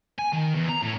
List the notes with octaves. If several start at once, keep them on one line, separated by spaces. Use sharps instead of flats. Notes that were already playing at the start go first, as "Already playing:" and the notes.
G#5
D#3
E2
A#5
A2